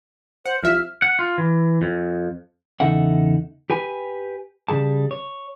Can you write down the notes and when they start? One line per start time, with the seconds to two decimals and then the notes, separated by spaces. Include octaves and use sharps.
0.46 C5 F#5
0.63 C2 F3 E5 F6
1.02 F#5
1.19 F4
1.38 E3
1.82 F2
2.80 E2 C#3 D#4 A4 E5 F#5
3.70 G4 B4 G#5
4.68 C#3 G3 G#4 A5
5.11 C#5